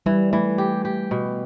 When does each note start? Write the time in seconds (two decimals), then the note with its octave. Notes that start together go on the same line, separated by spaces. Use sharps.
0.06 E3 G3
0.32 E3 A3
0.58 G4
0.85 G4
1.11 B2